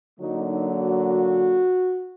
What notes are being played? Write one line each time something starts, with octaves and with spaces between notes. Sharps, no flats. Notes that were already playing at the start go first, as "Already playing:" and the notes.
D3 F#3 A#3 D#4 F#4
D#4
F#4